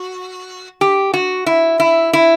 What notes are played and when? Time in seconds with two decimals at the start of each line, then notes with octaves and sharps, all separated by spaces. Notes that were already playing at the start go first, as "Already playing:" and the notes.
Already playing: F#4
0.81 G4
1.14 F#4
1.46 E4
1.80 E4
2.13 E4